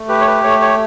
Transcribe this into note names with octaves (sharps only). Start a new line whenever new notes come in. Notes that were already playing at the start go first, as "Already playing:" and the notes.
Already playing: A3
G4 B4
C#5
B4
A3 C#5
C#5